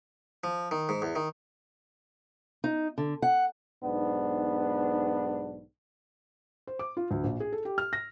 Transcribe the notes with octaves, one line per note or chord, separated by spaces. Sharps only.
F3
D#3
G#2
E2
D#3
D#4
D3
F#5
B1 G#2 B3 D4
C5
D6
F4
D2
A#1
G#4
A4
G4
F6
A#6